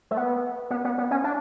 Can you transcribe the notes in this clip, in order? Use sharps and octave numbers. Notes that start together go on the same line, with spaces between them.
A3
B3
B3
B3
B3
C#4
D4